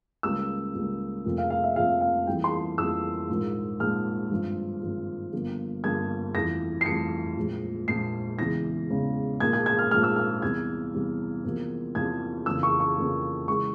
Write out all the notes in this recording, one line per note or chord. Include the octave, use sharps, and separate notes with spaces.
C#2 C#3 G3 A#3 E6
C#2 C#3 G3 A#3
F1 F2 C3 F3 A#3
F5
F5
E5
F1 F2 C3 F3 A#3 F5
F5
F2 E3 G3 A#3 G5
C6
F2 E3 G3 A#3 E6
A#1 G#2 F3 A#3
A#1 G#2 F3 A#3 F6
G#1 G2 F3
G#1 G2 F3
G1 G2 F3 A#3
G1 G2 F3 A#3 G#6
F1 F2 E3 G3 A#6
C7
F1 F2 E3 G3 C#7
A#1 A#2 F3 G#3
A#1 A#2 F3 G#3 C7
E2 C#3 E3 G#3 A#6
E2 C#3 E3 G#3
A#1 G#2 F3 A#3 G#6
G#6
G#6
F6
A#1 G#2 F3 A#3 F6
E6
F6
E2 C3 G3 G#6
E2 C3 G3
E2 C3 F3 A#3
E2 C3 F3 A#3 G#6
F2 C#3 E3 A#3 E6
C#6
C#6
F2 C#3 E3 A#3
C#3 E3 G#3 C#6